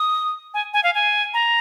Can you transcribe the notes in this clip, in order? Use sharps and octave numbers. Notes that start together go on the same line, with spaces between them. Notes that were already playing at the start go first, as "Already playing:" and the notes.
Already playing: D#6
G#5
G#5
F5
G#5
A#5